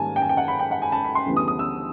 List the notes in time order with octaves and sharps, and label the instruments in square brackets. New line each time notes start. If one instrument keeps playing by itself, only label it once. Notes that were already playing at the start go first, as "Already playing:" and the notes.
Already playing: [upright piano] G#2 D#3 G3 A#3 C#4 G#5 A5
G5
G#5
G5
F#5
B5
G5
F#5
G#5
A5
B5
C6
D2 C#3 E3 G3 B3
D#6
D#6
E6